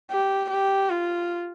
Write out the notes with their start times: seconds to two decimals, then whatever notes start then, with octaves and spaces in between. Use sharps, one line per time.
0.11 G4
0.50 G4
0.90 F4